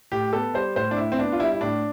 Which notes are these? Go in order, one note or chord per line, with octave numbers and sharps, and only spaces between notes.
A2 G4
B3 A4
G3 C5
A2 C5
D4
A2 E4
C4
B3 D4
F4
G3 E4
E4
A2 D4